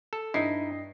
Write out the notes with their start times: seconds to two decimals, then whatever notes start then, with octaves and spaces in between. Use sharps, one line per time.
0.13 A4
0.34 G2 D#4 E4 D#5 C7